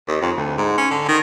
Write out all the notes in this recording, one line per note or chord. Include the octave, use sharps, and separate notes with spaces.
D#2
F2
D2
G#2
C#4
D3
D#3